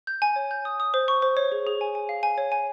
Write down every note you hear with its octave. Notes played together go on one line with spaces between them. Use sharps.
G6
G#5
C#5
G6
D#6
D#6
C5
C#6
C5
C#5
G#4
G#4
G#5
G#5
F5
G#5
C#5
G#5